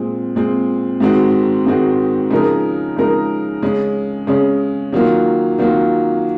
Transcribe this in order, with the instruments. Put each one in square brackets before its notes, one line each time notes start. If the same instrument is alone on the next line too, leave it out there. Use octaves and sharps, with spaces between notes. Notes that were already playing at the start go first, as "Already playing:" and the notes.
Already playing: [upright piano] A#2 G#3 C4
A#2 G#3 C4
G#2 D#3 G#3 C4 F#4
G#2 D#3 G#3 C4 F#4
C#3 F3 G#3 D#4 A#4
C#3 F3 G#3 D#4 A#4
C#3 G#3 C#4
C#3 G#3 C#4
D#3 F#3 A#3 F4
D#3 F#3 A#3 F4